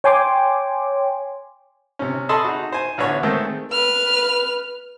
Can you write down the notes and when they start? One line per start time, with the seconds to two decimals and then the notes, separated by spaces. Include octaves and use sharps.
0.04 C#5 G5 G#5 C6 D6
1.99 C3 C#4
2.29 G#4 A4 D#5 A5 B5 C6
2.44 D#4 F#4
2.72 C5 G#5
2.98 A1 D3 B3 C#5
3.23 D#3 G#3 A3 C4
3.71 B4 F6